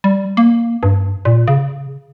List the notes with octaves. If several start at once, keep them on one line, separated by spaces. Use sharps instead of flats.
G3
A#3
G2
A#2
C#3